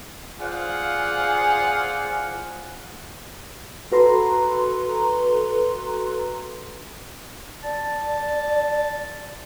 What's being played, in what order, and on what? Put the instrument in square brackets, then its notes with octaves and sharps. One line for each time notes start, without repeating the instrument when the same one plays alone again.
[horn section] F4 G#4 C5 D5 F5 F#5
[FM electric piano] F#4 A4 B4 A#5 C6
[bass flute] D5 [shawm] A5